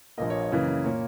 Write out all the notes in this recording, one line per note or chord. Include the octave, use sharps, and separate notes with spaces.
A#1 A#2 A#3 D#5
C#5
D#5
F#2 C#3 E3 A#3
A#2 A#3 C#5